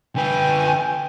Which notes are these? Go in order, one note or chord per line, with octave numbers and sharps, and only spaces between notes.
D3 B4 G5 G#5